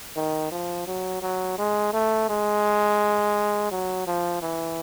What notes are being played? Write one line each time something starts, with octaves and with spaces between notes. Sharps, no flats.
D#3
F3
F#3
F#3
G#3
A3
G#3
F#3
F3
E3